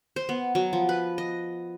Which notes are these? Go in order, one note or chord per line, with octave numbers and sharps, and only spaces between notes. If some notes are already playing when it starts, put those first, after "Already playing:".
C5
B3
F#3
F3
B4
D#5